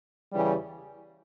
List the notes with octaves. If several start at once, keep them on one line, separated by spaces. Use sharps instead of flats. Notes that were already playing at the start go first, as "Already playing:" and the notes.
E2 C#3 E3 G3